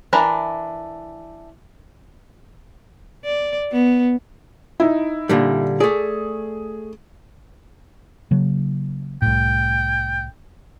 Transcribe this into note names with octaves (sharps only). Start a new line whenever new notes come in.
E3 D4 A#4 A#5 B5
D5
B3
D#4 E4
A#2 D3 G3
A3 G#4 D5
C#3 F#3 A#3
C2 A2 G5